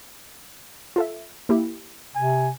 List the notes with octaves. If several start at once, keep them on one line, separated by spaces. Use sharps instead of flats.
F4 A4 E5
A#3 E4 G4
C3 G#5